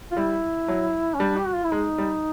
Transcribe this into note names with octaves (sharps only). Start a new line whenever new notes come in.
F4
G3 E4
F#3
C#4
G3 D4
G4
F#4
F4
E4
G#3 D#4
G3